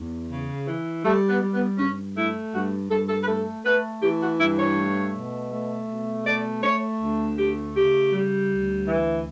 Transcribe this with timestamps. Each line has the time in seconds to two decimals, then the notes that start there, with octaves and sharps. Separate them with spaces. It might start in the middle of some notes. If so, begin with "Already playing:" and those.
Already playing: E2
0.30 C#3
0.66 E3
1.04 G3 A3
1.29 B3
1.41 G3
1.54 B3
1.78 G2 C#4
2.16 A3 E4
2.52 G2 F#4
2.90 G2 A4
3.09 A4
3.23 B4
3.27 A3 A4
3.65 A3 B4
4.02 E3 G4
4.21 F#4
4.39 G2 E4
4.58 C#5
4.76 A3
5.14 B2
5.51 A3
5.88 B2
6.25 A3 D5
6.63 A3 C#5
7.01 D2
7.38 A3 G4
7.75 C#3 G4
8.12 G3
8.49 D2
8.87 E3